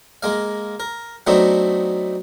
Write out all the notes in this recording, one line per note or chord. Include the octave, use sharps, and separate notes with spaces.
G#3 A#3 F5
A#4
F#3 A3 B3 C4 D4 D#4